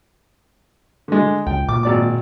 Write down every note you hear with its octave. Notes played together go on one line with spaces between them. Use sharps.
D3 G#3
C#2 G5
A#2 D6
G#1 D5 D6